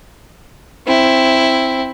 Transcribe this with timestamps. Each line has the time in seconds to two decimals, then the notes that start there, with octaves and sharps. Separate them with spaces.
0.87 C4 E4